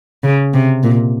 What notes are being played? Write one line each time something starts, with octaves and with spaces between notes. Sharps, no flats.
C#3
C3
A#2